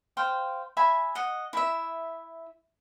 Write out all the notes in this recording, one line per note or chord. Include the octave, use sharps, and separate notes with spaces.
C5 F5 G5
E5 G#5 B5
D#5 F#5
E4 E5